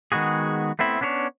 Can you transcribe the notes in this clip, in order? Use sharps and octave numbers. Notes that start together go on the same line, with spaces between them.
D#3 G#3 B3 F#4 G#4
A3 B3 C4 E4
B3 C#4 D4 G4 C#5